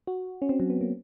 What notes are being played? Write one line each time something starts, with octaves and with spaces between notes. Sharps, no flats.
F#4
C#4
C4
F#3
B3
A#3